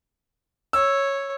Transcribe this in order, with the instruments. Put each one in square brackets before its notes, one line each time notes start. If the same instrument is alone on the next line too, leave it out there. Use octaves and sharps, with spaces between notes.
[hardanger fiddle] C#5 [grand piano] E6